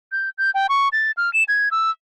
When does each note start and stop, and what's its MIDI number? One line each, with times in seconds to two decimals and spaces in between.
0.12 0.30 91
0.38 0.51 91
0.54 0.67 79
0.69 0.89 85
0.93 1.11 93
1.17 1.32 89
1.33 1.44 100
1.48 1.69 92
1.71 1.91 88